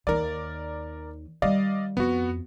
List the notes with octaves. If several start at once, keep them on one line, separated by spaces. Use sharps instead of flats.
D#2 D#3 A#4 D5
D#3 G3 D5 D#5 F5
F2 B3 F#4